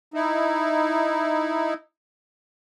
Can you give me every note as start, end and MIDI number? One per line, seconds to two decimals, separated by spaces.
0.14 1.74 63
0.14 1.74 64